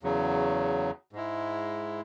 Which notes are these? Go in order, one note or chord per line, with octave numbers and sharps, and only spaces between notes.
E2 C#3 F#3
G#2 G#3 E4